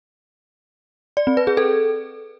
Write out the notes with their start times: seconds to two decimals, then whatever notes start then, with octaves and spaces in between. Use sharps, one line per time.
1.17 D5
1.27 C4
1.37 B4
1.47 G#4
1.57 A4